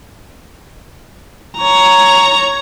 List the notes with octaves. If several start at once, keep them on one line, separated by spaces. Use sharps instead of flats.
C#5 A#5